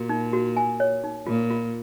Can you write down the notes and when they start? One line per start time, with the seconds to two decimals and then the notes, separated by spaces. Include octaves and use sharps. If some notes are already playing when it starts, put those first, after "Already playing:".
Already playing: A#2 F#4
0.09 D#4
0.33 F#4
0.57 G#5
0.80 C#5
1.04 D#4
1.26 A#2 F4
1.50 F4